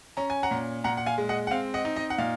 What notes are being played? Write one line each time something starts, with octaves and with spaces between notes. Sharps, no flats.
C#4 A#5
G#5
F#5 A#5
A#2
A#2 F#5 A#5
F#5
F5 G#5
G#3
D#5 F#5
F#5
C4 F5
D#5 F#5
D#4
D#5
F#5
A#2 F5